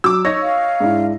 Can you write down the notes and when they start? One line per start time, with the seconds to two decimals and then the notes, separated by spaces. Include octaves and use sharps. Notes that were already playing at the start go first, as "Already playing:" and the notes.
0.04 F#3 D6 E6
0.25 D#4 C#5 A#6
0.42 F5
0.80 G#2 D4 E4